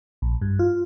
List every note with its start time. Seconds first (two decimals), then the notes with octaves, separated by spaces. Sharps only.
0.22 A#1
0.42 G2
0.59 F4